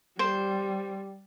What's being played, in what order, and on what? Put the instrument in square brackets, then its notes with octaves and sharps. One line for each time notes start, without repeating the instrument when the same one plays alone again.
[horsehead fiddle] G3 [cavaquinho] C5